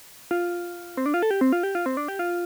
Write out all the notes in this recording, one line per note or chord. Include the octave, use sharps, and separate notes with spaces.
F4
C4
D4
F4
A4
G4
C4
F4
G4
F4
C4
D4
G4
F4